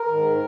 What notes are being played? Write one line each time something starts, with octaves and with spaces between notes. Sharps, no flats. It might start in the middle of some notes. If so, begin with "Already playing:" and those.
Already playing: A#4
G#2 D#3